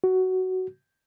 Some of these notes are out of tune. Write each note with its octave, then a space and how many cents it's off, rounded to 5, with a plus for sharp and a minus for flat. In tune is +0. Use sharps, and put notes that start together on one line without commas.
F#4 +10